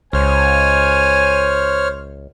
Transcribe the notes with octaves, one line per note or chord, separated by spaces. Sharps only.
C#2 C5 C#5 G#5 F6